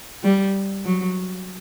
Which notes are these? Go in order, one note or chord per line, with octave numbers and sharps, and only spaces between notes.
G3
F#3